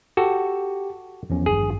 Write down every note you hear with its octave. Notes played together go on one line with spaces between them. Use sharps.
F#4 G4 A4
E2 F3 C#4
G#1 G2 G#4